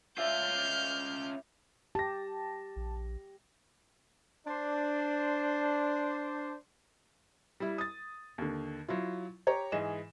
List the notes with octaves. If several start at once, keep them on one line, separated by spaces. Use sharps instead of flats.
C#4 F4 D5 E5 F6 G6
G4 A5 A#6
A#1
D4 C5
G3 E4
D#6 A6
D#2 D3
F#3 E4 F4
G4 C#5 A#5
G#2 E3 G#4 D#5 E7